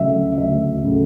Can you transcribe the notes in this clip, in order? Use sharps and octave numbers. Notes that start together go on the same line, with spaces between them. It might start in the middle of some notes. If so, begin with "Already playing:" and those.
Already playing: D2 C#3 F#3 A3 E5
D2 E5
C#3 F#3 A3